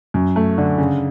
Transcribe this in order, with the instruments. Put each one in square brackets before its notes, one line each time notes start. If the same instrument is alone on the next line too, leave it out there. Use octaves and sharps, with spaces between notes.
[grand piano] F#2
A3
D3
C#3